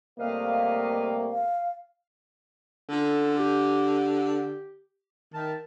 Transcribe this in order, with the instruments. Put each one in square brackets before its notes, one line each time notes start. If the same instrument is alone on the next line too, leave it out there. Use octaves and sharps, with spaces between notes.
[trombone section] C3 G3 A3 [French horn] A#3 [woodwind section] B4 D#5 F5
[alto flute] F5
[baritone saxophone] D3 [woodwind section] C#4 F4 A4
[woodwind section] G4
[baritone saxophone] D#3 [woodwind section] A#4 E5 A5